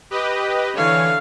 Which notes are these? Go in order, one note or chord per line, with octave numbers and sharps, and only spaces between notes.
G4 B4 D#5
D3 E3 C#5 F5